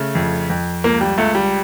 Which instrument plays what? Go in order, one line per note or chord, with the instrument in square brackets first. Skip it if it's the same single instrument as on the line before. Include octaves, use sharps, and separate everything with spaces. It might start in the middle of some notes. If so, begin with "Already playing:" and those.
Already playing: [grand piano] C#3 A3
F2
F2
C#2 A#3
G3
C#2 A3
G3